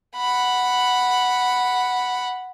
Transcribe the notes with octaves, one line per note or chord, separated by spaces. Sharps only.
F#5 B5